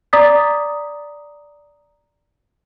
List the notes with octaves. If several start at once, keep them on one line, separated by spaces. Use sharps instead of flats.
D5 A#5 D6 D#6 A6 B6